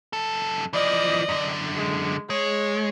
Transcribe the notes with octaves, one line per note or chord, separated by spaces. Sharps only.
F#2 A4
E3 F3 D5 D#5
F#2 D3
G#3
G#3 C#5